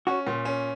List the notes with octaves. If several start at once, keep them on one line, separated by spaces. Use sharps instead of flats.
C#4 F#4
A#2
C#4